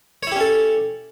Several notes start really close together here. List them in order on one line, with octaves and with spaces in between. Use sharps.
C#5 E4 G4 C#4 A4